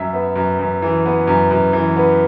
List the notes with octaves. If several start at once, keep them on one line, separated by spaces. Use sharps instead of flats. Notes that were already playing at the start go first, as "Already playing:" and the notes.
Already playing: F#2 E5
B3
F#2
F#2
E3
B3
F#2
F#2
E3
B3